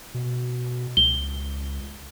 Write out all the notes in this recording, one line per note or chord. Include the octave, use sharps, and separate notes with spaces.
B2
C#2 G7